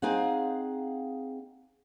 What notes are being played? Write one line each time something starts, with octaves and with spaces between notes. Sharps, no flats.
C4 D#4 G#4 F5 F#5